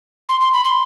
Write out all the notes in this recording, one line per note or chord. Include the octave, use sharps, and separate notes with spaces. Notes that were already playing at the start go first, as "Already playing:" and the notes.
C6
C6
B5
C6